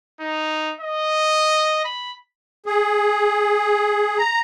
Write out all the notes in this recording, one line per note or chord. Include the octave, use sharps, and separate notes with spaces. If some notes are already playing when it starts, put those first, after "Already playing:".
D#4
D#5
B5
G#4
A#5